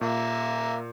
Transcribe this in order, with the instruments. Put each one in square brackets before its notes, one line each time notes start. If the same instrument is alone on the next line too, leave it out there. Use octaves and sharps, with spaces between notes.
[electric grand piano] A#2 [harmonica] A#3 E5